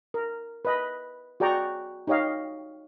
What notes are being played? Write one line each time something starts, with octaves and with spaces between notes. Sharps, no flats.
A#4
B4 D#5 B5
F#4 G#4 D5 G5 A#5 C#6
D#4 G4 C#5 D#5 F5